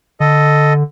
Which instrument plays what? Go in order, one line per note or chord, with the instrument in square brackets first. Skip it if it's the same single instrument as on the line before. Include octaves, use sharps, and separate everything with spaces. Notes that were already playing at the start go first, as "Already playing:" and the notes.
[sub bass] D3 [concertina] A4 D#5